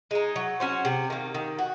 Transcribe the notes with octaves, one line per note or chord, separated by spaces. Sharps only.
G#3 D#4
F#3
C#4 F#4 C5
C3
D#3 A#3
D#3
F#4